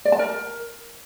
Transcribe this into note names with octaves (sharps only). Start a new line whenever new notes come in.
D5
A5
A#4